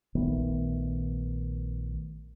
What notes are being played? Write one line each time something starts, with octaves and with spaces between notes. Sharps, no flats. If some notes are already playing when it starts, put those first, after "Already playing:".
A#1 D#3 A3 B3